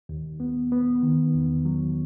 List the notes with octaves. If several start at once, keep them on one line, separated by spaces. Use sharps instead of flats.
D#2
B3
B3
D#3
E2
F#3